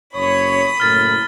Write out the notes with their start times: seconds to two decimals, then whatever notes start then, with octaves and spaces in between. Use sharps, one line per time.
0.15 F#1 F#2 C#5 B5 D#6
0.80 F#1 A2 A#4 F6 A6